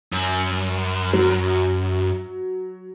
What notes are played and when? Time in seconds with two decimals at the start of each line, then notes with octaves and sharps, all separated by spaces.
0.12 F#2
1.13 F#3